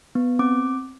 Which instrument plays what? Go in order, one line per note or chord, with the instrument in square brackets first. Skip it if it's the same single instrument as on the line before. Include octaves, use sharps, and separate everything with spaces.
[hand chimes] B3
C4 D6